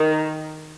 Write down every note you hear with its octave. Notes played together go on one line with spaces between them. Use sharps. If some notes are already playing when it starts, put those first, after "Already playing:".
Already playing: D#3